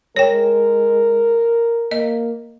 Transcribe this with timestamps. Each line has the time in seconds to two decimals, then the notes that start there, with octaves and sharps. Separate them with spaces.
0.16 G#3 A#4 C#5 G5
1.91 A#3 D#5